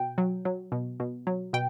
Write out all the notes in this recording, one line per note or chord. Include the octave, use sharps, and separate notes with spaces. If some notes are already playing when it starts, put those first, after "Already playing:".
Already playing: B2 G5
F#3
F#3
B2
B2
F#3
B2 G5